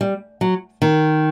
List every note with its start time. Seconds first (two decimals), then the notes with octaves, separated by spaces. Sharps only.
0.01 G3
0.41 F#3
0.82 D#3